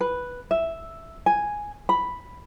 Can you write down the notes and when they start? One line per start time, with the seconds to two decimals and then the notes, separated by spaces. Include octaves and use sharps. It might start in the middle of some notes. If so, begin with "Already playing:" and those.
0.01 B4
0.51 E5
1.26 G#5
1.89 B5